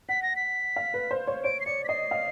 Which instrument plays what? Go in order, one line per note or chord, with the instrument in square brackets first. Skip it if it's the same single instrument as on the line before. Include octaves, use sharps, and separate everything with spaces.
[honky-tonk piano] F#5 [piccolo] B6
[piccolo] A#6
B6
[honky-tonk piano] F5
B4
C5
C#5
[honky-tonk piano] C#5 [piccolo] D7
[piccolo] C7
[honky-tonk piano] D5 [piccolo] C#7
[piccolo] B6
[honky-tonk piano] D#5 [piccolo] C7
[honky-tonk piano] F5